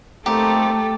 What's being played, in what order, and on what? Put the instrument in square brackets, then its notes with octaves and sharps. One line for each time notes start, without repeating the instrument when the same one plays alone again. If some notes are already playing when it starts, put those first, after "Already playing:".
[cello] A3 A4 [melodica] A#3 C4 D#4 [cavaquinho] G4